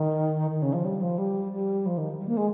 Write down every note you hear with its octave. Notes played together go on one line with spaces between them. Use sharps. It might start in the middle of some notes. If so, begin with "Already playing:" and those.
Already playing: D#3
D#3
C#3
F3
G3
F3
G3
G3
F3
D#3
G3
A#3
G#3